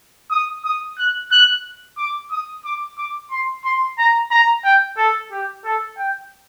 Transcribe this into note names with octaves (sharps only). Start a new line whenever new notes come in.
D#6
D#6
F#6
F#6
D6
D#6
D6
D6
C6
C6
A#5
A#5
G5
A4
G4
A4
G5